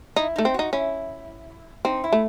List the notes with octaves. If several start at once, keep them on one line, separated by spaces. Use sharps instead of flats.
D#4 E4
A3 D#4
C4
D#4 F#4
C#4 E4
C4 D#4
E4
A3